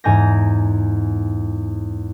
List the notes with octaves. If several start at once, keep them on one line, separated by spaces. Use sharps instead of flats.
E2 G#2 G#5 A#5 G6 A#6